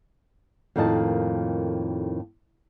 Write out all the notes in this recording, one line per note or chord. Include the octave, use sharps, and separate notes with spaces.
F2 A2 D#3 A#3 D#5 A5